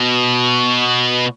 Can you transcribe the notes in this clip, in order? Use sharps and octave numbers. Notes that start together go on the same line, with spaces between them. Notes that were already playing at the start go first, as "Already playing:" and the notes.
Already playing: B2